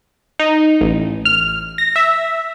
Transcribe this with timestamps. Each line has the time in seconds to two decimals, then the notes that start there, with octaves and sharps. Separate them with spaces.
0.39 D#4
0.81 A1
1.25 F6
1.78 A#6
1.96 E5